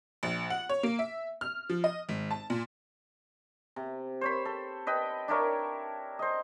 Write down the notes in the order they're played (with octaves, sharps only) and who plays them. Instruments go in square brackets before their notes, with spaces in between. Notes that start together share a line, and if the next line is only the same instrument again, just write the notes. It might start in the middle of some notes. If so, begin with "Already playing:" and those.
[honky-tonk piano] A#1
F#5
C#5
A#3
E5
F6
F3
D#5
G#1
A5
A#2
[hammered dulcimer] C3
C5 C#5 B5
A4
B4 D#5 G5
D4 E4 A#4 C#5
C5 D#5